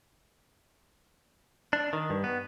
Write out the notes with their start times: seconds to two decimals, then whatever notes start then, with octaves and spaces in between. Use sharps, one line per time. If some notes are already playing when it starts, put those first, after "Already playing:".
1.73 D4
1.93 D#3
2.10 G2
2.24 B3